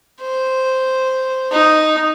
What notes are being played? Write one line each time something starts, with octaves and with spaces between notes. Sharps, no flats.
C5
D#4